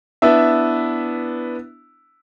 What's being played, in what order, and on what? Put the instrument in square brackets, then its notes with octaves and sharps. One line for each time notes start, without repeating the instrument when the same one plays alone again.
[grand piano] B3 D4 E4 E5